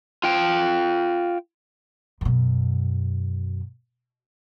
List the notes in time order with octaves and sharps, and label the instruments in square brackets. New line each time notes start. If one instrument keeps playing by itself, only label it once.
[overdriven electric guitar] F4 G5
[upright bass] F#2 B2